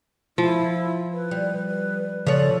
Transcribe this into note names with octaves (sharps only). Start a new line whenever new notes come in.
F3 E4
B4
G3
B4
C#3 F3 A4 C#5 D5